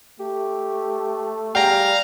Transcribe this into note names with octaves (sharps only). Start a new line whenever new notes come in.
A3 G4
G3 G#4 F5 G5 A#5